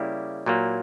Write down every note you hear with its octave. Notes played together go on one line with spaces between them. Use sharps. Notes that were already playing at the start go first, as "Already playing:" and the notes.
Already playing: C#3 G3 A#3 E4 G4
A#2 F#3 A#3